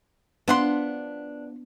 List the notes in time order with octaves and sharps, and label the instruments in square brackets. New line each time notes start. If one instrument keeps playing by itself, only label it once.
[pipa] F3 F#5 C6 [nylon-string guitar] B3 [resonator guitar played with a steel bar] D4